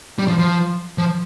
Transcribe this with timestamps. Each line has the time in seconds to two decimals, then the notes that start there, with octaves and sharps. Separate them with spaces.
0.19 G3
0.28 F3
0.39 F3
0.98 F3